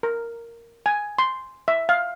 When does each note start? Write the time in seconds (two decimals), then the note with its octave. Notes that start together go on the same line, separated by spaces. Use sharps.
0.03 A#4
0.86 G#5
1.19 C6
1.68 E5
1.89 F5